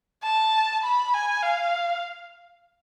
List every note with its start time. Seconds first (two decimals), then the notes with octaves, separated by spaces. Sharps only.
0.23 A5
0.83 B5
1.14 G#5
1.43 F5